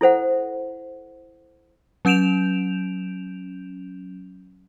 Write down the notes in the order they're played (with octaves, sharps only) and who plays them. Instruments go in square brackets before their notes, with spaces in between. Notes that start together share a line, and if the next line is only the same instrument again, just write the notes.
[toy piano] E4 A4 C5 F#5
[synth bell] F#3 C#4 G6 D7 E7 F7